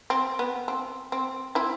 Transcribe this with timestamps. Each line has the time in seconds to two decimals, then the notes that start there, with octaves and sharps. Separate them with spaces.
0.10 C4
0.39 B3
0.68 C4
1.12 C4
1.55 C4 E4